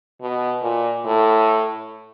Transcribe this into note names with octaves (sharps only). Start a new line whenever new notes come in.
B2
A#2
A2